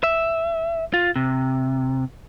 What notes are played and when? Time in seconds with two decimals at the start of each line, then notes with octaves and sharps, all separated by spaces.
0.03 E5
0.94 F4
1.16 C3